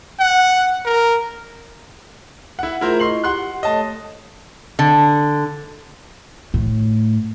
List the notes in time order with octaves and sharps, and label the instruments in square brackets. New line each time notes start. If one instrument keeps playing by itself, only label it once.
[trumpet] F#5
A#4
[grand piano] E4 F#5
[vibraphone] A3 F4 G#4 [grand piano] E4 A#4 C5
[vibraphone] E4 D#5 C#6 [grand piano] C6 C7 F#7
[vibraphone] G4 [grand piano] F#5 C6 F#6
[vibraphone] A3 A4 C#5 [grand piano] D#5 A5
[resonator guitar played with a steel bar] D3
[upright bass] A2